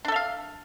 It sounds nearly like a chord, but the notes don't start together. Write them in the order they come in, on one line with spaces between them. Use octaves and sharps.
D4 A4 E5 F5